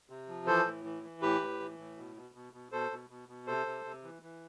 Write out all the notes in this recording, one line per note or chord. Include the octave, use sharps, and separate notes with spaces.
C3
F3
E3 A4 C5
A2
E3
E3
A2 G4 B4
A2
E3
A2
B2
B2
B2
B2
B2 A4 C5
B2
B2
B2
C3 A4 C5
C3
C3
E3
E3